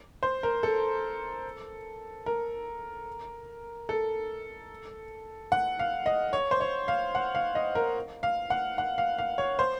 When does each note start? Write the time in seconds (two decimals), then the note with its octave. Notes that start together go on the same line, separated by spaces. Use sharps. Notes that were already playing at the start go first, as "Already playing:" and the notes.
0.23 C5
0.43 A#4
0.63 A4
2.26 A#4
3.89 A4
5.52 F#5
5.79 F5
6.06 D#5
6.33 C#5
6.51 C5
6.61 C#5
6.88 F5
7.15 F#5
7.35 F5
7.55 D#5
7.75 A#4
8.23 F5
8.50 F#5
8.78 F#5
8.98 F5
9.18 F5
9.38 C#5
9.59 C5